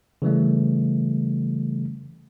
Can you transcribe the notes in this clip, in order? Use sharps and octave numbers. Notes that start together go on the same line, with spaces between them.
C#3 E3 G3 A3